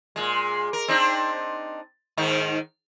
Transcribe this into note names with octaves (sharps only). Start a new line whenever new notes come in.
A#2 G#3
A#4
C4 D4 D#4
G#2 D#3 D#4